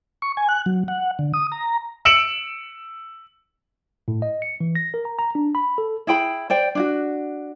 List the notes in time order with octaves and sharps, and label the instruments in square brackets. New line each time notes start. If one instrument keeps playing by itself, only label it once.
[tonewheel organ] C#6
G#5
F#6
F#3
F#5
D3
D#6
A#5
[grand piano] E6 C#7 D7 E7 F#7
[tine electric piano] A2
D#5
C#7
E3
A#6
A#4
A#5
A#5
D4
B5
A4
[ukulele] E4 G#4 G5 B5
C5 D5 G5
D4 E4 F#4